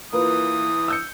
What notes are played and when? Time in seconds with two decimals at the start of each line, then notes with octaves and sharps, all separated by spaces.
0.13 E3 A#3 F4 B4 D#6
0.88 E6 G6 C#7